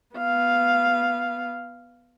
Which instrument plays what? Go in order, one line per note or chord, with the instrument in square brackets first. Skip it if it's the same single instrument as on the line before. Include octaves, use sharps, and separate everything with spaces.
[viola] B3 F5